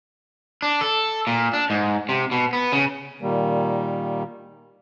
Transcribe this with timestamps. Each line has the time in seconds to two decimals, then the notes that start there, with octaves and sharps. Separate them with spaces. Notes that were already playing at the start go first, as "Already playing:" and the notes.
0.62 D4
0.81 A4
1.27 A#2
1.53 D4
1.70 G#2
2.09 C3
2.31 B2
2.53 B3
2.73 C#3
3.22 A#2 D#3 G3 A#3